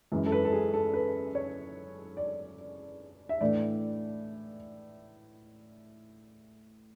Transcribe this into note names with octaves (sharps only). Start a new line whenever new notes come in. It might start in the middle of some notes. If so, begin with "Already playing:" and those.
F#2 E3 G#3
A4
B4
A4
G#4
A4
B4
C#5
D5
E5
A2 E3 A3 D4 D5